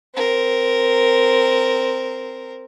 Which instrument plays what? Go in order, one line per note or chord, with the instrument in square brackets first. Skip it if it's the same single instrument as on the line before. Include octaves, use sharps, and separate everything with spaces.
[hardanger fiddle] C4 A#4